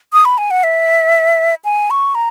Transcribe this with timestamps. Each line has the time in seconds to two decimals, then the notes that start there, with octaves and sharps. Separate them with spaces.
0.13 D#6
0.25 B5
0.38 G#5
0.51 F#5
0.63 E5
1.65 G#5
1.90 C#6
2.15 A#5